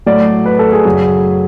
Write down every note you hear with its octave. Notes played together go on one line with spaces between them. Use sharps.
A2 F#3 A3 D5
B4
A4
G#4
F#2 C#3 F#3